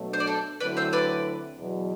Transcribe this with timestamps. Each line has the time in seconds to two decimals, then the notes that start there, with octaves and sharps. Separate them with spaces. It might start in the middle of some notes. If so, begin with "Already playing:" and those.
Already playing: B2 F#3 A3 D4
0.13 C5
0.20 D5
0.27 A4 C5
0.60 D2 D3 F#3 C4 E4 B4 D5
0.77 C5 E5
0.93 B4 D5
1.57 E2 B2 F#3